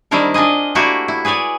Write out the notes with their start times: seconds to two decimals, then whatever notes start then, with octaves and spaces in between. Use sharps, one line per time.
0.11 D#3 G3 C4 D4 E4 A#4
0.34 D4 F4 G#4 D#5
0.75 A3 A#3 D4 E4 F#4 G4
1.08 E4
1.25 G#4 B4 C#5 D5 G#5